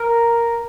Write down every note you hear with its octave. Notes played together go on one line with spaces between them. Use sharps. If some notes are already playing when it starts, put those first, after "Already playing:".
Already playing: A#4